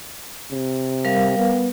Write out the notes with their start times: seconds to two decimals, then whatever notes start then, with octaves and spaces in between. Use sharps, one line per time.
0.52 C3
1.05 G3 A#4 F5
1.38 B3